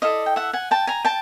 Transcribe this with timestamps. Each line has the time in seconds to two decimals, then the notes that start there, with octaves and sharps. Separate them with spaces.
0.02 E4 A4 D5 D#5 F5
0.26 G5
0.36 E5 F#5
0.53 F#5 G#5
0.71 G5 A5
0.87 G#5 A#5
1.05 G5 A5